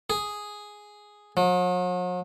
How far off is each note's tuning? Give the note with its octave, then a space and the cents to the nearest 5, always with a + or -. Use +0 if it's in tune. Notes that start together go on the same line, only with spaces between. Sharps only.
G#4 +0
F#3 -45